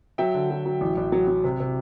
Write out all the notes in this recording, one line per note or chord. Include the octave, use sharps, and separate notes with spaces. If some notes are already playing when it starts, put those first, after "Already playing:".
F#3 E5 G5
D3
F#3
F#3
A1
A1
F#3
F#3
C3
C3